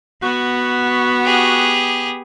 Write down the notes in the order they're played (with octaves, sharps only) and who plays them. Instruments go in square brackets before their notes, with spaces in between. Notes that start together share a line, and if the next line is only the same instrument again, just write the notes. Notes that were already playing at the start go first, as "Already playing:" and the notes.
[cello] B3 [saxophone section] F#4
[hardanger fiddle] G4 G#4